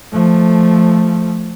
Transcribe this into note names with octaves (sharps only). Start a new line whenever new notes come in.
F3 A3